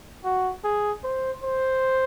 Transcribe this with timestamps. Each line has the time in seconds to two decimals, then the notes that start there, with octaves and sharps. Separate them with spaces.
0.24 F#4
0.64 G#4
1.04 C5
1.43 C5